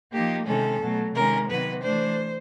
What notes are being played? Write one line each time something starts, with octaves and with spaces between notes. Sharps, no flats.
F3 A#3 D#4 G4
C3 D#3 G#3 C#4 A4
B2 F#3 A3
C3 D#3 G#3 C#4 A#4
C3 D#3 F#3 B3 B4
E3 A3 D4 C5